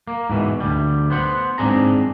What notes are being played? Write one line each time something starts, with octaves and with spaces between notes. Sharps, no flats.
A#3
G#2 B2 E3
D2 G3
B3 C5 F#5
G#2 D3 C4 D4 G#4 A#5